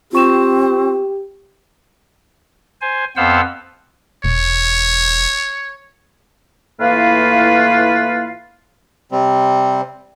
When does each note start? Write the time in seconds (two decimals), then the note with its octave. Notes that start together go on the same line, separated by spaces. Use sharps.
0.13 C4 F4 G4 C#6 E7
2.81 C5 G#5
3.17 F2 B3 C5 F5 F#5 E6
4.24 E1 C#5
6.80 A2 E3 A#3 F4 B4 F5
9.12 C3 G3 C4